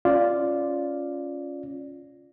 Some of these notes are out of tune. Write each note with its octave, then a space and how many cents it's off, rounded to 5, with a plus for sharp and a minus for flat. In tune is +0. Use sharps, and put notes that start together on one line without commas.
C#4 +0 F4 +0 D5 +0